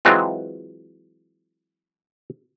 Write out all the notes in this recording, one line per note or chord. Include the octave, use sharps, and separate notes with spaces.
E3 F#3 G#3 C4 F4